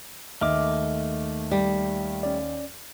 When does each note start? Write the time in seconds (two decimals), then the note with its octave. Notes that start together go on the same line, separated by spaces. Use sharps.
0.41 D#2 A3 D#5 E5 D6 F6
1.51 G3
2.23 C#4 D5